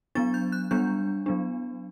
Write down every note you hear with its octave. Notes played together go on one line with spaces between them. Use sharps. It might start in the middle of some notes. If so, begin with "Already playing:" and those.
F#3 B3 D4 A6
G6
F#6
G3 B3 D4 G6
F#3 B3 D4